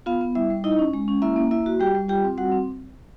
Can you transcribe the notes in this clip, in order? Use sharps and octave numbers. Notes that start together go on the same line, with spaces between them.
B3 F4 F5
B3
G3 E4 E5
G3
D#4 E4 D#5
C#4
G#3
C#4
A#3 E4 E5
A#3
A#3 E4 E5
F#4
G3 G4 G5
G3
F4 G4 G5
C4
G3 F#4 F#5
C4